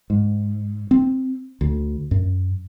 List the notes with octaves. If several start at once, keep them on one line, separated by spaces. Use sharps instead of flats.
G#2
C4
D2
F#2